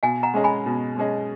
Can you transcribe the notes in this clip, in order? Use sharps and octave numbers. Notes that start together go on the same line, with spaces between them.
B2 F5 G#5
F#5 A#5
G#3 C#4 G#4 D#5
G#5 B5
B2
G#3 C#4 G#4 D#5